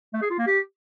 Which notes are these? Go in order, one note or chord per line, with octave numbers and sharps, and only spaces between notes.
A3
G#4
F4
A#3
G4